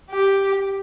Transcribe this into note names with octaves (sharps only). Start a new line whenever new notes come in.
G4